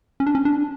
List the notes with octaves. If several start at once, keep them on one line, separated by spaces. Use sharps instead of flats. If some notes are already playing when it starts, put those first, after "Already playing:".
C#4
D4
C#4
D4